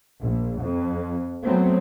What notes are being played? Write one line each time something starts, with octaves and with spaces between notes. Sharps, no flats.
A#1
F2
F#3 A3 B3 C4